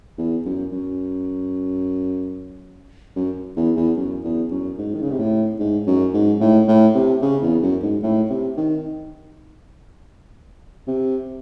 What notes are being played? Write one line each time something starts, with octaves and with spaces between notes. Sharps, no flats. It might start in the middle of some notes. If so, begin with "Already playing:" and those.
E2
F#2
F#2
F#2
E2
E2
F#2
E2
F#2
G#2
D#3
C#3
C3
A2
G#2
F#2
G#2
A2
A2
C3
C#3
E2
F#2
G#2
A2
C3
D#3
C3